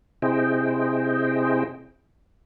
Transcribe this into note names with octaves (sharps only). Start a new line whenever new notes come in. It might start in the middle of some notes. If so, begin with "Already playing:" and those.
C3 E4 G#4 C5 D#5 G5